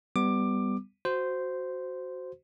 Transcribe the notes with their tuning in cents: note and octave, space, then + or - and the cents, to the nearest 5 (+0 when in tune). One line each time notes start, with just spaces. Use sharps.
G3 +0 B3 +20 D6 +15
F#4 +0 C5 -10